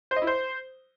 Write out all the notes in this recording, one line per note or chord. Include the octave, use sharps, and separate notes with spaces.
C5
D#5
E4
C5